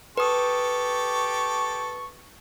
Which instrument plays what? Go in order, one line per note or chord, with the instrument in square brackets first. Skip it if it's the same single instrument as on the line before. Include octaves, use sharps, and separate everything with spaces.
[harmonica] G4 A4 C#6 [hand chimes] B4 D#6